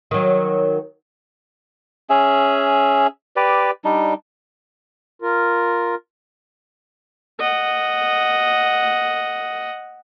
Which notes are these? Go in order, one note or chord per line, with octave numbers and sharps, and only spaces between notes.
D#3 F#3
C#4 G#4 E5
G4 B4 D5
G3 D4 D#4
F4 A#4
D#5 F#5